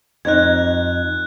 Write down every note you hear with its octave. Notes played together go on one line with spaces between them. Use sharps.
F2 D#4 F#6 G#6